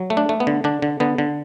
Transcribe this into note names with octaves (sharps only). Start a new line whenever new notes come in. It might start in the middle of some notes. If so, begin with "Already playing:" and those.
Already playing: F#3
A3
D4
A3
B3
D3
D3 D4
D3
D3 B3
D3